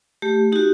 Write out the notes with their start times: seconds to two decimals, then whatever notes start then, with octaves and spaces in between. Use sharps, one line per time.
0.22 A3 G4
0.52 D#4 F#4 G4